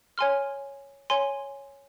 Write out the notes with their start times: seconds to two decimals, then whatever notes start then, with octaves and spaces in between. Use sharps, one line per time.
0.18 C#5 G#5 C6 F6
1.10 C#5 G#5 C6